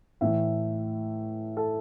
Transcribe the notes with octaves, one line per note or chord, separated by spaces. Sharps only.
A2 E3 A3 E5
A4